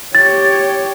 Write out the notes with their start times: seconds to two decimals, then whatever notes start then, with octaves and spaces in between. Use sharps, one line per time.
0.15 G4 C#5 A6